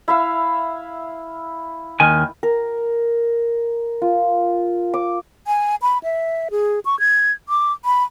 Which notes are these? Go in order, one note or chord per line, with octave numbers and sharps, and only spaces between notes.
E4 E5 F5
D#2 D#3 G#5
A#4
F4
D6
G#5
B5
E5
G#4
C#6
G#6
D6
B5